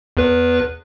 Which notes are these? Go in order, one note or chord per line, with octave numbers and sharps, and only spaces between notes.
E2 B4